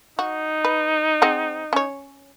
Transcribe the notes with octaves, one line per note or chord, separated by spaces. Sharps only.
D#4 F#4
B4
C4 G#4 F#5
C#4 C#5